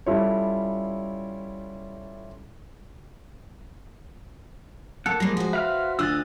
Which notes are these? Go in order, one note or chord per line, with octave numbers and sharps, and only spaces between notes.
G3 C#4 E4 F4 A4 C#5
A#3 A4 F#5
F3 G3 G#3 A#3 A#6 C7
F#4 C5
B4 E5 F5 F6
D2 D4 F4 D#5 E6 F#6 A6